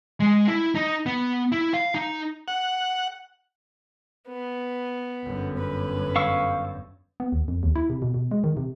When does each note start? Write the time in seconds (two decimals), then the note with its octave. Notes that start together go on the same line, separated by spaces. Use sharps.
0.20 G#3
0.47 E4
0.75 D#4
1.06 B3
1.52 E4
1.74 F5
1.95 D#4
2.48 F#5
4.28 B3
5.25 G1 F#2
5.58 B4
6.16 F5 C#6 E6
7.20 B3
7.32 D#2
7.48 F2
7.63 D#2
7.75 E4
7.90 C3
8.02 B2
8.14 B2
8.31 G#3
8.44 D#3
8.57 C3